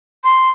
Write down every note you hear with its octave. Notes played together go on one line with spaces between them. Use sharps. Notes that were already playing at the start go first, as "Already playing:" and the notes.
C6